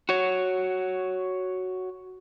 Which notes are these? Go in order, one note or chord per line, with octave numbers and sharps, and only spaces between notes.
F#4 C#5